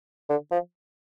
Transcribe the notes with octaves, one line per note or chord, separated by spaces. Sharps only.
D3
F3